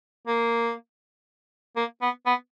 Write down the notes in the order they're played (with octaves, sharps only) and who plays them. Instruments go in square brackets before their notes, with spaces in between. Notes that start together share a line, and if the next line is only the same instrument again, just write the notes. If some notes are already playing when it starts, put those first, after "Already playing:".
[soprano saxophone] A#3
A#3
B3
B3